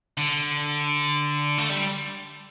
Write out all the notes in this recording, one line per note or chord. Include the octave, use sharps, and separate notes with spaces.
D3
A3
G3